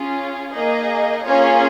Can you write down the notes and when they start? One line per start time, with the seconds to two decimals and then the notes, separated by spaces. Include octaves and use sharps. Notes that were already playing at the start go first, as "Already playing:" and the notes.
Already playing: C#4 F4 G#4
0.52 A#3 D#4 G#4 D#5
1.24 A#3 C#4 F4 G#4 C#5